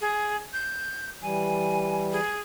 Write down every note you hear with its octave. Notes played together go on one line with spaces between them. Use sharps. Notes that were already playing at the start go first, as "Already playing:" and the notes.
G#4
G6
E3 G3 G#5
G#4